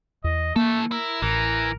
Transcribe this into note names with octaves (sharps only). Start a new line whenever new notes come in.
E2 D#5
E3 A3 A#3 A4
E4 A#4
A1 E3 A#4